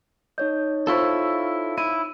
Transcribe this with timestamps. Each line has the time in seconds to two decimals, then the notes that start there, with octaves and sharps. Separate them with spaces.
0.38 D#4 C#5 D#5 G6
0.87 E4 F4 A4 C5 C#6 E6
1.78 E4 D#7